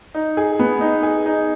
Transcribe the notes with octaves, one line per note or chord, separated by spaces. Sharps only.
D#4
G#4
B3
D#4
G#4
D#4